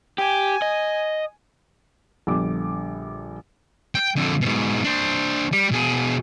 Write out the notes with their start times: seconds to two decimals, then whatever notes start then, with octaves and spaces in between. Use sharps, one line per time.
0.18 G4 G#5
0.62 D#5
2.27 A#1 D3 G3 B3 D6
3.95 G5
4.16 F2 D3
4.41 G#2 B2
4.85 D4 C5
5.53 G3
5.72 B2 G#4